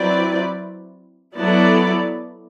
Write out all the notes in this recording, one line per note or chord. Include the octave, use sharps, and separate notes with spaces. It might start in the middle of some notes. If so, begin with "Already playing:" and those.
Already playing: F#3 C4 E4 B4 D5
F#3 B3 E4 A4 D5